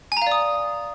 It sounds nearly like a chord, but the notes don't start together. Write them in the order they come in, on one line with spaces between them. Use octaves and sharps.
G#5 A#5 F5 D5 D#6